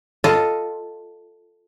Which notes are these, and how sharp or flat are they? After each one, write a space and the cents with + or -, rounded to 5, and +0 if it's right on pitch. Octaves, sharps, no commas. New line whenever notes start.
F4 +0 A4 +5 D#5 +0